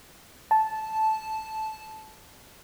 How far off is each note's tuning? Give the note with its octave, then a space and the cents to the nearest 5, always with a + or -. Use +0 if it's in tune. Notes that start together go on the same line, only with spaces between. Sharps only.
A5 -10